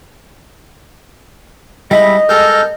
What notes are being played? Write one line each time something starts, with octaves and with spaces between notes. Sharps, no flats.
G3 G#3 D#4 E4 D#5 E5 B5
G3 G#3 A4 A#4 F6 G6